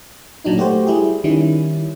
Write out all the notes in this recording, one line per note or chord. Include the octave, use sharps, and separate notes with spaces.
A#2 F#3 D4 D#4
A3 F#4 G4 C5
G3 E4 G4 G#4
D#3 G3 C#4 E4